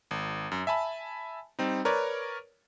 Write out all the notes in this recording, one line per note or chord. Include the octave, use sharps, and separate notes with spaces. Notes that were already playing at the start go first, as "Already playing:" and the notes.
G#1
F#2
E5 G#5 A5 B5
G3 C4 D#4
A#4 B4 C#5 D5